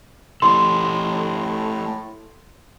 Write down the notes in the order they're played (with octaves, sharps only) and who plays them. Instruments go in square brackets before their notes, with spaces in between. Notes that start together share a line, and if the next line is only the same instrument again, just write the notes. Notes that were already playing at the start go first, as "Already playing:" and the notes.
[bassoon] A2 [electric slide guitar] A3 G4 A4 [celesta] C6